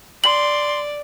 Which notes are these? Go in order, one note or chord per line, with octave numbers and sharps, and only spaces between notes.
D5 C6 F#7